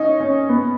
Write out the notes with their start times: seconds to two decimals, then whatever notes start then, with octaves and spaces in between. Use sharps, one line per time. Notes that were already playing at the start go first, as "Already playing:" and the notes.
Already playing: C#4 D#4
0.20 C#4
0.49 B3